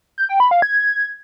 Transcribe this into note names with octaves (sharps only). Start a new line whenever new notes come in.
G6
G5
B5
F5
G#6